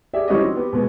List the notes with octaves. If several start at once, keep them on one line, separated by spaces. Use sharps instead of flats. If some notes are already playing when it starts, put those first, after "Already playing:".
G4 G#4 D5 E5
E3 G3 C#4 F#4 G4 D#5
C4 D#4
B3 G4 B4
B2 G#3 B3 C4